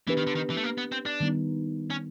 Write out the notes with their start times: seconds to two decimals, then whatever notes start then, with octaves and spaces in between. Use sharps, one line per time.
0.07 E3 B3 D4 G4 B4
0.17 D#3
0.27 D3
0.35 D#3
0.50 E3
0.57 A3
0.64 A#3
0.78 B3
0.92 C4
1.06 D4
1.20 D#3 G3 B3 D#4
1.90 C#4